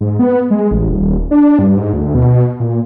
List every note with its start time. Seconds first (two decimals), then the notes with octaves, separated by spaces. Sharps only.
0.01 G#2
0.19 B3
0.50 G#3
0.71 A1
0.89 D#1
1.31 D4
1.59 G2
1.77 G#2
1.93 D2
2.15 B2
2.60 A#2